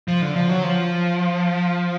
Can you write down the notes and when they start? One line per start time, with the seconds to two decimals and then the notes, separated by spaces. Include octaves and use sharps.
0.08 F3
0.22 D3
0.36 F3
0.49 F#3
0.63 F3